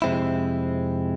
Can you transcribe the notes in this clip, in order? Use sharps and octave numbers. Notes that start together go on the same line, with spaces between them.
F2 C3 G#3 C4 E4